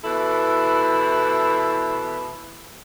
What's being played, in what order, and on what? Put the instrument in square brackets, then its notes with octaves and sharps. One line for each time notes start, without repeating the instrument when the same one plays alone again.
[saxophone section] B2 E3 E4 A4